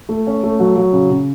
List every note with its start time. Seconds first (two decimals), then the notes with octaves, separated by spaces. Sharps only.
0.09 A3
0.27 C#4
0.44 A3
0.59 F#3
0.77 F#3
0.93 C#3
1.10 C#3